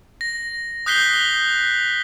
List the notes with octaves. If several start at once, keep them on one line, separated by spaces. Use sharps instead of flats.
A#6
D#6 F#6 G6 B6 C7 G7